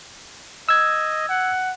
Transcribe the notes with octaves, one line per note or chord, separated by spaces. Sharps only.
D#5 E6 G#6
F#5